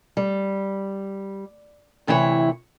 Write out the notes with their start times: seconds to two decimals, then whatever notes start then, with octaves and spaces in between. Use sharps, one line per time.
0.17 G3
2.07 D2 C3 E3 E4 F#4 C#5